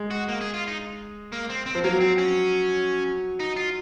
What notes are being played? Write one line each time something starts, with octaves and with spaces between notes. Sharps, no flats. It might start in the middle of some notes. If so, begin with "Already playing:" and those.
Already playing: G#3
F#4
A#3
G#4
F4
D#4
A#3
C4
C4
F3
F#3 A#3
C4
C#4
D#4
F4